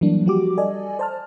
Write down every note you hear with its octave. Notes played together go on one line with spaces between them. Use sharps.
E3 F#3 G3 A#3 D4
F3 G3 F#4 G4 D6
A4 D5 D#5 G#5
C5 A5 F6